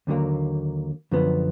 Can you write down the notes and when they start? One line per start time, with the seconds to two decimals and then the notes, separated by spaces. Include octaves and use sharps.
0.07 D#2 D3 F#3 A#3
1.12 F#2 D3 F3 B3